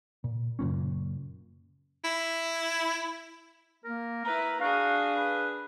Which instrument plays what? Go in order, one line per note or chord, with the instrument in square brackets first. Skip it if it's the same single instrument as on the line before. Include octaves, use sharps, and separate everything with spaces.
[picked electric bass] A#2
F#1 A#2 C#4
[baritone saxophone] E4
[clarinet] A#3 [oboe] A#4
[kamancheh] E4 B4 [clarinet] A#5
[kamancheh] D4 G#4 [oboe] F#4 [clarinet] F5
[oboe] B4